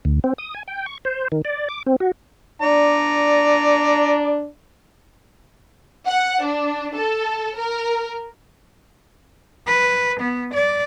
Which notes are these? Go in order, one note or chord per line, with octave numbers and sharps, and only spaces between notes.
D2
C4
D#6
G#5
G5
C#6
C5
D#3
D5
D6
C4
F#4
D4 D5 A#5
F#5
D4
A4
A#4
B4
B3
D5